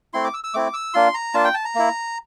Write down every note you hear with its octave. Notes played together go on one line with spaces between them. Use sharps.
A3 C4 E4 C6
D6
E6
E6
A3 C4 E4 D6
E6
A#3 D4 F4 C6
A#5
A#3 D4 F4 A5
G5
A5
A#5
A#3 E4